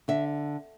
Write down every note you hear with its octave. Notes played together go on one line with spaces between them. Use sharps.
D3 E5